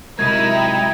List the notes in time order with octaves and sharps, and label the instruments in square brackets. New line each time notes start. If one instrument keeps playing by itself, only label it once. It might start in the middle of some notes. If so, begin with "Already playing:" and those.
[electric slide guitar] C3 F#3 G#3 [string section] D#4 E4 [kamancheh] A#4 [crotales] G#6
[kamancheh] G5